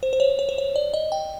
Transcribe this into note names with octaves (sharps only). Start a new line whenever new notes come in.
C5
C5
C#5
C#5
C5
C#5
D5
D#5
G5